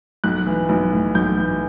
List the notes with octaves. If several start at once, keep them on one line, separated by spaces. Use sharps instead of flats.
B1 F#6
E3
B1
A2
B1 G6
E3